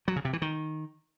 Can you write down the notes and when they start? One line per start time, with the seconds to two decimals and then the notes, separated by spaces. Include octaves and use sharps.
0.08 F#3
0.16 C#3
0.25 C3
0.33 E3
0.42 D#3